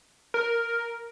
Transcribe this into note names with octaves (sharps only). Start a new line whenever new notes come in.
A#4